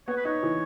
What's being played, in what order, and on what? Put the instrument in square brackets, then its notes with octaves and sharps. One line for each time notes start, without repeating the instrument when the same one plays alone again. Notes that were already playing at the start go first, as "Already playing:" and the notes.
[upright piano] B3 [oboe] C#5
[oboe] B4
[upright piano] D#4 [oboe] C#5
[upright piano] E3